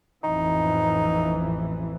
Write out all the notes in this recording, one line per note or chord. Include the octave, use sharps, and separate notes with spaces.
A1 F2 E3 D#4